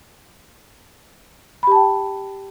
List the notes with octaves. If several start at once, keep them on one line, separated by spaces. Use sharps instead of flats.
G4 G5 A5 B5